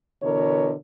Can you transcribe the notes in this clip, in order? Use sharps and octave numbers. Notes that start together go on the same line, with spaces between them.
B2 D3 E3 A#4 C#5